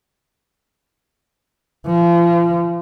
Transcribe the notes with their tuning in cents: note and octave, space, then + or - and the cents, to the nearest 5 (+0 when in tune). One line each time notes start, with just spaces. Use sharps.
F3 -35